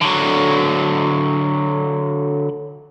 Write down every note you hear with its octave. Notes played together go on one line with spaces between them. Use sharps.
D3 F#3